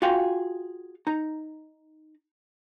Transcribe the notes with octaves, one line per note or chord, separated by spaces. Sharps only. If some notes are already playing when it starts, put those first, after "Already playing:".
F4 F#4 G#4 F5 G5
D#4 A#5